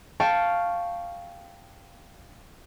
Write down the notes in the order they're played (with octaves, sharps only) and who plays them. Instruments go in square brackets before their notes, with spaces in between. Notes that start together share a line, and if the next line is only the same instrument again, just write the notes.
[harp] F5 G5 A5 C#6